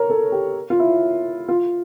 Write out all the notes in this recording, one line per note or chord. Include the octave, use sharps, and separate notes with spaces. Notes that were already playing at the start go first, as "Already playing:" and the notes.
Already playing: A#4 C#5
A4
G4
F4
E4
F4